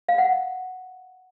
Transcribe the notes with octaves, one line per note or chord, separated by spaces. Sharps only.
F5
F#5